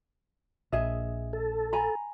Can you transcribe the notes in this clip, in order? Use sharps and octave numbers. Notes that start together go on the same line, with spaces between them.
A#1 G#4 D#5 E5
A4
G#5 A#5 B5